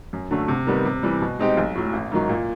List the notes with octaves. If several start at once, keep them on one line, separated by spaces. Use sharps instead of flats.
F#2
D3 F#3 A3
C3
D#3 G3 B3
C3
E3 G3
B2
G#3 C4 D#4 G4
B1
A2 F#3
A1
G#2 D#3 F#3
A#2